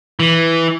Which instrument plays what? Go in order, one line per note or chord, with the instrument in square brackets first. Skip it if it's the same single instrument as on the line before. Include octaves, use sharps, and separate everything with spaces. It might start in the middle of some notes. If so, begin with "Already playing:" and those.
[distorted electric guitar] E3